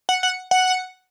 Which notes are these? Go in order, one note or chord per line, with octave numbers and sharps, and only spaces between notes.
F#5
F#5
F#5